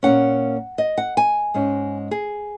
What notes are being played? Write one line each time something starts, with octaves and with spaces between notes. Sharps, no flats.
A#2 A#3 C#4 F#5
D#5
F#5
G#5
G#2 G#3 C#4
G#4